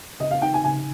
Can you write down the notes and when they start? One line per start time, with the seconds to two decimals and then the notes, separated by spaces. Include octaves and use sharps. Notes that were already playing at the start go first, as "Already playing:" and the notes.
0.20 C#3 D#5
0.31 F5
0.42 D#4 G5
0.54 G#5
0.64 C#3 G#5